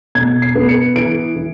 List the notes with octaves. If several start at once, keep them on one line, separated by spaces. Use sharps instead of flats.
B2 G#6
C7
B3
C#7
E3 D7
E3